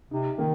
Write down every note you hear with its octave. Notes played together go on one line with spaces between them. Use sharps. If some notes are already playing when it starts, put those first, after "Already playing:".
C3 D#4
D#3 A#3